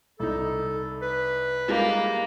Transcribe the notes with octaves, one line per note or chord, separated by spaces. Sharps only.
C2 D#4 A4
B4
G3 G#3 A#3 D#4